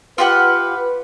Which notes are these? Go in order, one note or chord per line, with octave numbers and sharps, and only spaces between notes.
F4 G4 B4 F#5